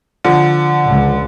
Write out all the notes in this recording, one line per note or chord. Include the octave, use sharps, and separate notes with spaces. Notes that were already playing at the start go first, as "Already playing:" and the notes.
D3 F3
C#2